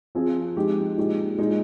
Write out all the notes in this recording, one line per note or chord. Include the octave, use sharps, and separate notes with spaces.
F3 C4 F4 G#4
F3 G#3 D#4 G4
A#2 G#3 D#4 G4
A#2 G#3 D#4